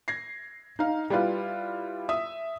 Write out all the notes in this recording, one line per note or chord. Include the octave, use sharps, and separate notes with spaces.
G#6 A#6 C7
D#4 F5
G3 E4 F4 B4 F5
E5 D#6